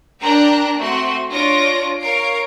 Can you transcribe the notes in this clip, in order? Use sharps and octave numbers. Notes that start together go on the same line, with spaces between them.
D4 A#4 G5 A#5 F#6
A3 C4 F#4 C6
D4 F4 C#5 A#6 D7
A#4 C#5 F5 C7 D7